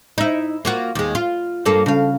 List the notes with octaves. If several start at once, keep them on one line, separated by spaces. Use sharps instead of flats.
D#4 E4
A#3 F4 F#4
D#2 G#3
F4
G2 A#3 A4
C#3 F5